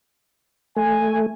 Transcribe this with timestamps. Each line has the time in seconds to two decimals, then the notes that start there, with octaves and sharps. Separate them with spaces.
0.76 A3 G#5